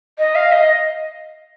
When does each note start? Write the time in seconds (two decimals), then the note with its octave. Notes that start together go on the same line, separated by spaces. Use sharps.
0.19 D#5
0.35 F5
0.52 D#5